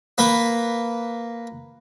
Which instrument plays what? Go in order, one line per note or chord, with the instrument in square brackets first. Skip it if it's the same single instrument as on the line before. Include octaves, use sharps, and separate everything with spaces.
[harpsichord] A#3 B4